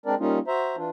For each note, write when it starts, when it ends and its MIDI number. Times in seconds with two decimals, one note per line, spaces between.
0.06 0.15 56
0.06 0.15 60
0.06 0.15 62
0.06 0.15 70
0.06 0.15 74
0.19 0.39 55
0.19 0.39 58
0.19 0.39 61
0.19 0.39 63
0.19 0.39 65
0.47 0.76 66
0.47 0.76 72
0.47 0.76 76
0.47 0.76 82
0.76 0.90 52
0.76 0.90 62
0.76 0.90 65